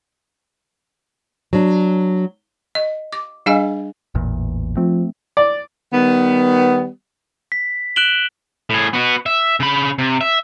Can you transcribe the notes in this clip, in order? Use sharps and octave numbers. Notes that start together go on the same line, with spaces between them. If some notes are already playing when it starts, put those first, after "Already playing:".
F#3 D4
D#5
D6
G3 D4 G#4 D#5 F5 G#5
A1 E2 A#2
F3 A3 C4
D5
D#3 G3 B3
B6
F#6 D7 E7 F#7 G7
A2 G#4
B3 F#4
E5
C#3 B5
C3
E5